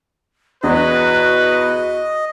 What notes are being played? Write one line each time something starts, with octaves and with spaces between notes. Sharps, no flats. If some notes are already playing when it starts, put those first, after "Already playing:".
E2 F#4 B4 D#5